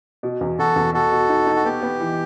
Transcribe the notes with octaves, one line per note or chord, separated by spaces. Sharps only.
B2
E2
E2 F#4 A4
E2
B2 F#4 A4
B2
D#4
D#4
F#4
B3 G4
B3
E3